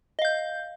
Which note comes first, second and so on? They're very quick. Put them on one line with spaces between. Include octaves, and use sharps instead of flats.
D#5 F5 G6